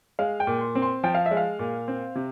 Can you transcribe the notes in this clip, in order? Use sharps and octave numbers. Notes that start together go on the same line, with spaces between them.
G#3 F5
G5
A#2
C6
C4
C6
F3 G5
F5
E5
G#3
F5
A#2
C4
C3